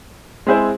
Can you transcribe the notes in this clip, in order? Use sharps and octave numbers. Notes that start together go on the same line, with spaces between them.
G#3 C4 E4 G#4 C5